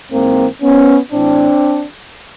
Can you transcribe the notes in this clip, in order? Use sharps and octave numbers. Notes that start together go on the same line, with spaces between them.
G#2 E3 A#3 C4
B3 C#4
A2 E3 C4 D4